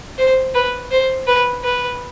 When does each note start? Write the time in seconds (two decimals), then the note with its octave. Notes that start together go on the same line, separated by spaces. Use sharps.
0.18 C5
0.54 B4
0.91 C5
1.27 B4
1.64 B4